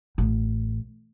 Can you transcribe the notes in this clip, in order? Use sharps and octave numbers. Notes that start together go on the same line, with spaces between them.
A1